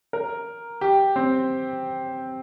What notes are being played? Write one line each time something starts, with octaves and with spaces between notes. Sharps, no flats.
A#4
G4
C4